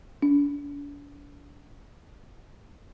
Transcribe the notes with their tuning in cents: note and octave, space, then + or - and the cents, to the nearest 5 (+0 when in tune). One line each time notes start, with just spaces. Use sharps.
D4 -40